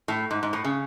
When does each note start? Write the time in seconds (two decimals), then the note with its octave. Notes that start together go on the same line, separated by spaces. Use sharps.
0.08 A2
0.31 G#2
0.43 G#2
0.53 A2
0.64 C#3